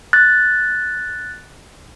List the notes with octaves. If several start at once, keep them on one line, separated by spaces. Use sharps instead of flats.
F#6 A6